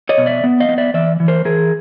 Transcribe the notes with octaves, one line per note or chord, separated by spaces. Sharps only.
C#5 D#5
B2
D5 E5
B3
D#5 F5
B3
D5 E5
E3 D5 E5
E3
A#4 C5
E3 G#4 A#4